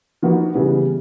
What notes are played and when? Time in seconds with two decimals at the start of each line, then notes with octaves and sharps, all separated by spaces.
0.22 F3 A#3 D#4 F#4 B4
0.55 C#3 E3 G3 B3